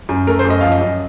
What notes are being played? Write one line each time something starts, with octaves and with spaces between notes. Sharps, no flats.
F#2
A3 A#4
C5
F#2
D#5
F3 F5
D#5
F#2